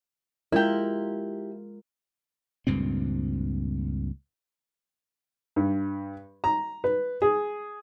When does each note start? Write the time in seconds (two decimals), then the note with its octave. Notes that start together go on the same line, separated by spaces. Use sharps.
0.52 G#3 E4 F4 G4 A#4
2.67 C#2 G2 A#2 C4
5.56 G2
6.44 A#5
6.84 B4
7.22 G#4